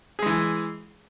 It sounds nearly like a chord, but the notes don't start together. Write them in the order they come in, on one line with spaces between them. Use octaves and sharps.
G#4 G#3 E3